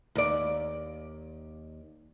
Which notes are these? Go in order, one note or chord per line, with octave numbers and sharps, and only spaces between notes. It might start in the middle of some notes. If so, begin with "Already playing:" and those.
D#2 D5